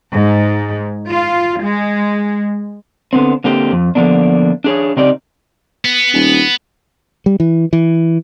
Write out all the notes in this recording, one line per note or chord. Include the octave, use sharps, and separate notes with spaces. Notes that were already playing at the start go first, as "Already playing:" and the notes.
G#2
F4
G#3
D3 B3 C4
D3 A#3 C4 G4
F2
D3 F3 A#3 B3 D4
D4 G#4 C#5
C#3 C4 D#4 G4 D5
B3
D#1
G3
E3
E3